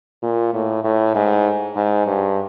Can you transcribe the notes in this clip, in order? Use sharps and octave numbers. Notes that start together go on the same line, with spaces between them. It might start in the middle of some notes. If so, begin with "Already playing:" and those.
A#2
A2
A2
G#2
G#2
G2